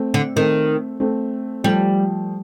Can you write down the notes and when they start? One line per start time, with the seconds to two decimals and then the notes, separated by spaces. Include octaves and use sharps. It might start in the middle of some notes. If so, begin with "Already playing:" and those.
Already playing: A3 C4
0.14 D3
0.36 D#3 A3 C4
1.00 A3 C4
1.64 F3 G3 A3